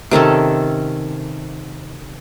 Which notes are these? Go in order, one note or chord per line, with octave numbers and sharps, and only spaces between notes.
C3 D#3 C#4 A4